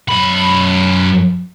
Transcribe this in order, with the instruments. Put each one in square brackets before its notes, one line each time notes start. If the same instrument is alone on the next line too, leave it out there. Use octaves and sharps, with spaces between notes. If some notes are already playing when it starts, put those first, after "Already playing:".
[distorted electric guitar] F#2 B5